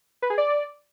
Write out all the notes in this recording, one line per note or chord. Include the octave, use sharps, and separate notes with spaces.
B4
G#4
D5